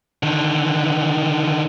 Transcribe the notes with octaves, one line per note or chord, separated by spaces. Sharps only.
D3 D#3